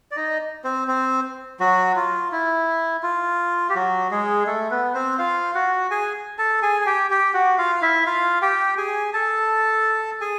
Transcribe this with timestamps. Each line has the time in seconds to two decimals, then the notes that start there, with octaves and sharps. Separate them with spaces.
0.11 D5
0.16 D#4 D#5
0.64 C4 C5
0.88 C4 C5
1.60 F#3 F#4
1.96 F4
2.32 E4
3.03 F4
3.69 G4
3.75 F#3 F#4
4.11 G#3 G#4
4.47 A3 A4
4.71 B3 B4
4.94 C4 C5
5.18 F4 F5
5.55 F#4 F#5
5.91 G#4 G#5
6.38 A4 A5
6.62 G#4 G#5
6.82 G#5
6.86 G4 G5
7.10 G4 G5
7.34 F#4 F#5
7.58 F4 F5
7.75 F5
7.82 E4 E5
8.06 F4 F5
8.42 G4 G5
8.78 G#4 G#5
9.13 A4 A5
10.21 G#4 G#5